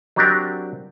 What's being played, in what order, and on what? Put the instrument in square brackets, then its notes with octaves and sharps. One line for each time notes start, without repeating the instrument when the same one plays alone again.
[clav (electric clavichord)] F#3 C4 D4 G4 A#4